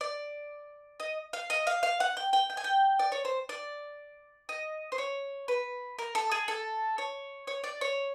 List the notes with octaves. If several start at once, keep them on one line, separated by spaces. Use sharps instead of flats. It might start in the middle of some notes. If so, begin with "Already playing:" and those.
D5
D#5
F5
D#5
F5
F5
F#5
G5
G5
G5
G#5
G5
D5
C#5
C5
D5
D#5
C5
C#5
B4
A#4
A4
G#4
A4
C#5
C#5
D5
C#5